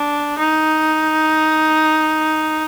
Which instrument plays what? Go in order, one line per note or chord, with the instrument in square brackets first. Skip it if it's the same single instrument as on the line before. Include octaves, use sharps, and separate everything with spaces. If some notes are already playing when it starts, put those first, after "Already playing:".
Already playing: [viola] D4
D#4